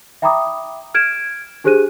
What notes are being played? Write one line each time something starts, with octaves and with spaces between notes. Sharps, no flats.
E5 G5 A#5 B5 D6 D#6
F6 G#6 D7 E7
D4 G4 G#4 C5 F#6 D#7